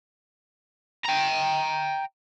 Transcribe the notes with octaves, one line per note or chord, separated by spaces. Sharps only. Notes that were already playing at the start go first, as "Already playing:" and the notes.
G5 A#5